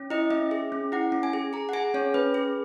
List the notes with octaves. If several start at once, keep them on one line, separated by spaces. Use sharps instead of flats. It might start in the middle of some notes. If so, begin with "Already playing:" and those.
Already playing: C#4
E4 D#5
C#4 E5
G#4
C#4
E4 F#5
C#4
G#5
G#4
G#4 A#5
F#5
G#4 G#5
C#4 C#5
C#4 B4
G#4